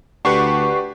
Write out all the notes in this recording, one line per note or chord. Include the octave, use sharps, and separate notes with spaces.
D2 D4 G4 B4 F#5 C#6 C7